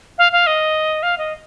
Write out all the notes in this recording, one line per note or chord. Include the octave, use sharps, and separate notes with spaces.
F5
F5
D#5
F5
D#5